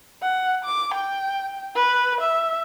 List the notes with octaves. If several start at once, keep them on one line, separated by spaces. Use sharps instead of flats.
F#5
D6
G5
B4
E5